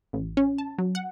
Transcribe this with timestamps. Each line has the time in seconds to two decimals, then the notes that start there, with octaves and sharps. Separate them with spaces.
0.13 A1
0.37 C#4
0.58 A5
0.78 F#3
0.95 F#5